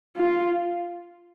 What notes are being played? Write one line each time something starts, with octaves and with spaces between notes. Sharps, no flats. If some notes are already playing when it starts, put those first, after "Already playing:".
F4